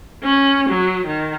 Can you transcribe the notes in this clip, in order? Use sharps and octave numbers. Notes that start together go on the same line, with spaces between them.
C#4
F#3
D#3